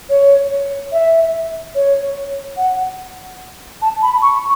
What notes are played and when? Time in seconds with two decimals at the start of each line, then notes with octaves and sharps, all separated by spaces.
0.09 C#5
0.92 E5
1.75 C#5
2.57 F#5
3.82 A5
4.02 B5
4.22 C#6